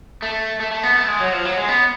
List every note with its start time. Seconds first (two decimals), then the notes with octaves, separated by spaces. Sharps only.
0.22 A3
0.60 A3
0.71 A3
0.83 B3
0.96 A3
1.08 G#3
1.20 F#3
1.33 F3
1.45 F#3
1.57 G#3
1.68 B3